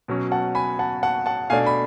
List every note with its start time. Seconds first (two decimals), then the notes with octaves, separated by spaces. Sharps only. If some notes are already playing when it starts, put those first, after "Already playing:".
0.08 B2 F#3 C#4
0.32 F#5 A5
0.55 G#5 B5
0.79 F#5 A5
1.03 F#5 A5
1.26 F#5 A5
1.50 B2 A3 D4 F5 G#5
1.66 B5